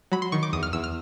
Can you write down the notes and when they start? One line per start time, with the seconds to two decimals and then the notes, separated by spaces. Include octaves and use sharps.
0.12 F#3 B5
0.22 C6
0.32 D#3 C#6
0.43 D6
0.53 E2 D#6
0.63 F6
0.73 E2 E6
0.84 F6